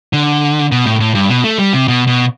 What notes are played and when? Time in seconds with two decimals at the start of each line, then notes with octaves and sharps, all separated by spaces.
0.13 D3
0.72 B2
0.86 A2
1.00 A2
1.15 G2
1.30 B2
1.44 A3
1.59 G3
1.73 C3
1.88 B2
2.07 B2